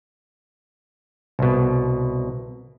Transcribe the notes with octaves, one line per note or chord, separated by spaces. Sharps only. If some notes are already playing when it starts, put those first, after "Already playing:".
C2 B2